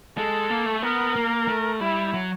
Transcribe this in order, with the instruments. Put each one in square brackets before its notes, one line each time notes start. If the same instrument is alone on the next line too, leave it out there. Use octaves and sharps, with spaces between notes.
[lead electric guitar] G#3 [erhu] A4
[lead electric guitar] A#3
A3
[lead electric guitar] B3 [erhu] A#4
[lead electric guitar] A#3
A3
[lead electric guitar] G3 [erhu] E4
[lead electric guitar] F#3